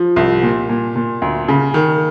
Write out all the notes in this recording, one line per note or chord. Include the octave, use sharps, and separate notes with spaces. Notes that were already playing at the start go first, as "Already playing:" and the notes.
Already playing: F3
C2
A#2
A#2
A#2
D2
C#3
D#3